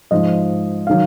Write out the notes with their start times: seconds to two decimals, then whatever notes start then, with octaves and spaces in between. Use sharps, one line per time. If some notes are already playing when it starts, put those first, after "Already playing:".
0.11 G#2 F3 D#5
0.87 D#3 F#3 F5